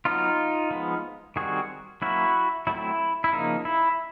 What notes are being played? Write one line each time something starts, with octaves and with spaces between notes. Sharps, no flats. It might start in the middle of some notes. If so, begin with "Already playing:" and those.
F#3 B3 D#4 F4
F3 G#3 B3
D#3 G3 C4 F#4 G#4
F#3 A#3 C#4 E4 F#4
F#3 A3 C4 E4
E4
C#3 F3 A#3 D#4
E4